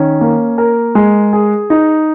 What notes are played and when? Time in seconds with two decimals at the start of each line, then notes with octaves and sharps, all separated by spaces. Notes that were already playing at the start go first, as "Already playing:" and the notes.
Already playing: D#3 C#4
0.21 A#3
0.58 A#4
0.95 G#3
1.33 G#4
1.70 D#4